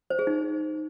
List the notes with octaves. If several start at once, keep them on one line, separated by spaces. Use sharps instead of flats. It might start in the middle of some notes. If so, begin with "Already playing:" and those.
C5
G#4
D#4